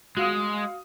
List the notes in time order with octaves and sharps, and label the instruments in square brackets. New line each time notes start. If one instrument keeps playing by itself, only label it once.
[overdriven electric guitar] G#3 [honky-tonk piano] F#4 F5 D#6